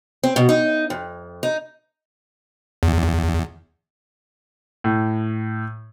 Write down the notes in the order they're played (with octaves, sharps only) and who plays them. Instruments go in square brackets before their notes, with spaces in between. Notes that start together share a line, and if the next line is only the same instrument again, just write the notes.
[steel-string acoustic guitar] C4
B2
D#4
F2
D#4
[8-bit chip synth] E2
[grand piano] A2